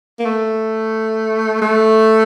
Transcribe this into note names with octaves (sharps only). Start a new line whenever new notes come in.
A#3
A3
A3